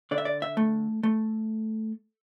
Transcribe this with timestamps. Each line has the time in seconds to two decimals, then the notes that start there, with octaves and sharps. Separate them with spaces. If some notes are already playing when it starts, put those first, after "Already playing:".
0.11 D3 D5
0.18 E5
0.25 D5
0.42 E5
0.57 A3
1.03 A3